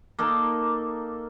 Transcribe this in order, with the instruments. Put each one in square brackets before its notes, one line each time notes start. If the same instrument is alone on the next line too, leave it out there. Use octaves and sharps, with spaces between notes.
[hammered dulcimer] A#3 D#4 A4 A#4